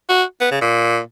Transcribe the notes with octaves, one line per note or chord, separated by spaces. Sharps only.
F#4
B3
C#3
A#2